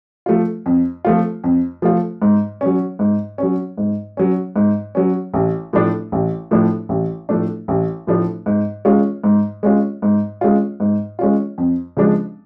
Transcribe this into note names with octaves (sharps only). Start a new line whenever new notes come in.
F3 A3 F4
F2
F3 A3 F4
F2
F3 A3 F4
G#2
F#3 C#4
G#2
F#3 C#4
G#2
F#3 C#4
G#2
F#3 C#4
A1
A2 F3 A3 D4
A1
A2 F3 A3 D4
A1
A2 F3 A3 D4
A1
A2 F3 A3 D4
G#2
G#3 C#4 F4
G#2
G#3 C#4 F4
G#2
G#3 C#4 F4
G#2
G#3 C#4 F4
F2
C#3 F3 G#3 D4